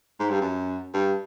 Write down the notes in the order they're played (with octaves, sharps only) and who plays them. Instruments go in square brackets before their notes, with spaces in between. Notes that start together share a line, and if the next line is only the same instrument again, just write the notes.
[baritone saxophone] G#2
G2
F#2
G2